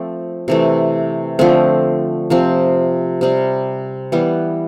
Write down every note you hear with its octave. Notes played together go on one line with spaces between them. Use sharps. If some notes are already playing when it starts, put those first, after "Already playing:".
Already playing: F3 A3 C4
C3 E3 A3
D3 F3 A3 C4
C3 F3 C4
C3 G3 C4
E3 G3 B3